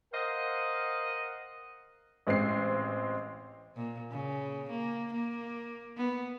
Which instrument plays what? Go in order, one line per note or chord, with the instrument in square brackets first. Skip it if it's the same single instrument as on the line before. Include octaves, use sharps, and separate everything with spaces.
[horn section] A#4 C5 D#5 F5 F#5
[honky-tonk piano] A1 G#3 C4 C7
[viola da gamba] A#2
C#3
A#3
A#3
B3